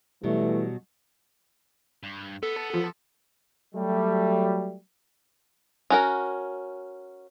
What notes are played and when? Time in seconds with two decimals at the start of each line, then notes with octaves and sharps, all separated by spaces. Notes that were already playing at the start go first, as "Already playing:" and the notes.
0.24 B2 E3 F#3 G3 A3
2.03 G2
2.43 B3 A4
2.74 F3
3.75 F#3 G3 A3
5.90 C#4 F#4 A#4